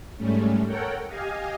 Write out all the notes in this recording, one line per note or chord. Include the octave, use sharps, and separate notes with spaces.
G#2 G3 A3 C#4
A4 A#4 C#5 F#5 G5
G4 D#5 F5 G#5